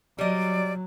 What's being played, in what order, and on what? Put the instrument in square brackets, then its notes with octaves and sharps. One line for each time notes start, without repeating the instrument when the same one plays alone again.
[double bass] F#3 [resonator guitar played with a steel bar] G3 D#5 [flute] D5